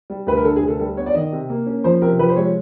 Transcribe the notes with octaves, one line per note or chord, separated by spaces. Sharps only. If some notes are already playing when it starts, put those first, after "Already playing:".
G3
D2 B4
A#4
D3 A4
G#4
D2
A4
G3 A4
B3 C#5
D5
D#3 D#5
C3
A#3
C#4
F3 C5
C3 A#4
F3 B4
C5
G#3 C#5